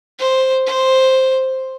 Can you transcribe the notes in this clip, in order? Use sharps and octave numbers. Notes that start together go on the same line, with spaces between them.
C5
C5